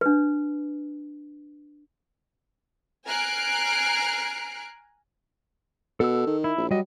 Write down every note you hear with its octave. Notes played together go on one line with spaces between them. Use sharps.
D4 B4
G#5 A#5 F6 F#6 C7 D7
B2 A4 E6
D#3
E4
A#1
F#3 G3 D#5